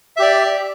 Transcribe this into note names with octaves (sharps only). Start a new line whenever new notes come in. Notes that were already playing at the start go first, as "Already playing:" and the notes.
G4 D5 E5